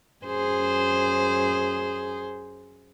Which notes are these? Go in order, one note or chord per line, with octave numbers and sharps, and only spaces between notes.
F#2 G#4 C5